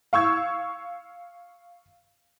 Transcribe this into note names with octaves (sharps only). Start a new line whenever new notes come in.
F5 C#6 E6 G#6